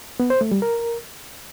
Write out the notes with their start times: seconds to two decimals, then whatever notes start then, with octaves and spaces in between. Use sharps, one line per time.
0.20 B3
0.30 C5
0.41 A3
0.51 G3
0.62 A#4